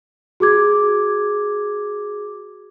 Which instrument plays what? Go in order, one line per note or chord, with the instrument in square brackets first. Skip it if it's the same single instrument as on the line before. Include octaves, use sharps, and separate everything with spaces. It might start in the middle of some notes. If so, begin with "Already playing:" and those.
[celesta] F#4 G#4 D6 G#6